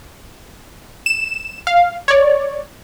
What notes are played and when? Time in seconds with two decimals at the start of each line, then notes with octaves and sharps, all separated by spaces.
1.06 E7
1.67 F5
2.08 C#5 D5